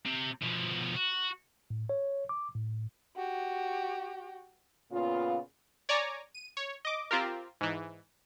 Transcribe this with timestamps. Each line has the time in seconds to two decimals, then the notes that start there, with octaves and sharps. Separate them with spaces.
0.06 C3
0.42 B2 F3
0.95 F#4
1.70 A2
1.89 C#5
2.29 D6
2.55 A2
3.16 F#4 G4
4.91 A#2 C#3 B3 F4
5.89 C#5 D5 G#5 A#5 D6
6.35 D#7
6.57 C#5
6.85 D#5 D6
7.11 C4 F4 G4 A#4
7.61 G#2 E3